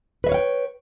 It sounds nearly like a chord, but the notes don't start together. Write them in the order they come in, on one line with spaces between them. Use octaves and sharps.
B4 E5 C#5 F5 G5